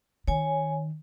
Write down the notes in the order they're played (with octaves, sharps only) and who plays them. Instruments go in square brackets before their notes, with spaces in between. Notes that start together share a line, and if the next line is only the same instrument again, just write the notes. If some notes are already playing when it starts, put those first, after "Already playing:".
[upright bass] D#3 [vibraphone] C#5 G#5